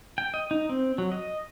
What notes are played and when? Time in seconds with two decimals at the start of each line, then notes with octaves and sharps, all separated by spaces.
0.18 G5
0.34 D#5
0.51 D#4
0.69 C4
0.98 F#3
1.12 D#5